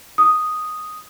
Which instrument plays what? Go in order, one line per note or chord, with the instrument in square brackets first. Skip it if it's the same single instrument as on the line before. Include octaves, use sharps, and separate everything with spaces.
[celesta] D#6